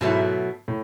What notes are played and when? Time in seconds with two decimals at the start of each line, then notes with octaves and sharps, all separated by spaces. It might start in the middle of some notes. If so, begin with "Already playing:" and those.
0.01 G#2 B2 F#3 A3 E4
0.68 A2